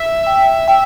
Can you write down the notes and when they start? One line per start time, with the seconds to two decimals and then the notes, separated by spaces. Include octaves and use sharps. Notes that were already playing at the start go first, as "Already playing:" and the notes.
Already playing: E5
0.27 G5
0.68 G5